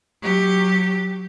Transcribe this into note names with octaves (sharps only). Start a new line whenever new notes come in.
F#3 G4